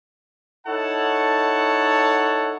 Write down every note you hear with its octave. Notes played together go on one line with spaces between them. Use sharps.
D#4 E4 A4 C#5 F#5 A5